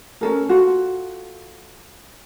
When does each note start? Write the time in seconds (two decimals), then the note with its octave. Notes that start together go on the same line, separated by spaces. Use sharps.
0.21 C#4 A4 A#4
0.49 F4 F#4 A4